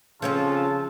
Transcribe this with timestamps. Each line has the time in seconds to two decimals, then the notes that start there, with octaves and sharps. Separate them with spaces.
0.22 C#3 F3 G#3 C4 C#4 F4 A4 A5